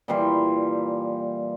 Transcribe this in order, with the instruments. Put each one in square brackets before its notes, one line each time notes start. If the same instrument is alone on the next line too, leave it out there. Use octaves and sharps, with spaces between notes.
[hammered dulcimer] A#2 E3 G3 C6